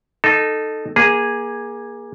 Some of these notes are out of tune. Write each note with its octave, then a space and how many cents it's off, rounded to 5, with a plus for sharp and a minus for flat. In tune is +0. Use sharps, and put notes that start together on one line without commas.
D#4 -15 A4 +0
A#3 +20 G#4 -10